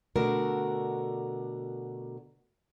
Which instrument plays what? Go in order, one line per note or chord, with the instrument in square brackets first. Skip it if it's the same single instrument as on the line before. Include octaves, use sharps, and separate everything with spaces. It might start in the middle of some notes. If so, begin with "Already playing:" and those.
[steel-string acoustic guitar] B2 D3 A3 D4 F#4 A#4